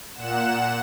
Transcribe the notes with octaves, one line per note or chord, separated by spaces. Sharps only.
A#2 F#5 E7